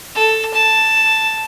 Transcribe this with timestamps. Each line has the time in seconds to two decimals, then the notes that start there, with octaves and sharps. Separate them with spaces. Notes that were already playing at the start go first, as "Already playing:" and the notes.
0.15 A4
0.54 A5